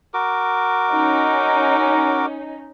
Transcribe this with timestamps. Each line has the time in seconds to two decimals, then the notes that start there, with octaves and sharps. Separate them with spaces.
0.14 F#4 A#4 D6
0.92 C#4 D#4